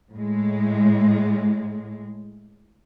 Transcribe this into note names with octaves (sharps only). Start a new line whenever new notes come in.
A2 G#3